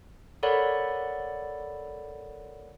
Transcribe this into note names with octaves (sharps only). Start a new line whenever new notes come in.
A4 A#4 C#5 D5 F#5 B5